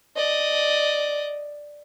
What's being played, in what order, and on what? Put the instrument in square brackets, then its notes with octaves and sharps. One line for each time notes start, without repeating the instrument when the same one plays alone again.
[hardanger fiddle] D5 D#5